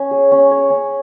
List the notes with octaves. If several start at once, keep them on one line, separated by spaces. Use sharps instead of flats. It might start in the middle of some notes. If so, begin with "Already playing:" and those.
Already playing: C#4
G#4
C#4
C#5
C#4